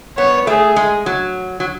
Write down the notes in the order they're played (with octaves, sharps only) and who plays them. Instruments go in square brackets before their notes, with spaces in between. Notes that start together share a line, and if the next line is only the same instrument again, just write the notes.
[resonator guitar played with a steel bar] B3 [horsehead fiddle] C#5
[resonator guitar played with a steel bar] A3 [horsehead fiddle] G#4
[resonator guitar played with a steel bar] G#3
F#3
F#3